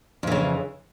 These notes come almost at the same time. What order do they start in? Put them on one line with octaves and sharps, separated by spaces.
F2 E3 C#3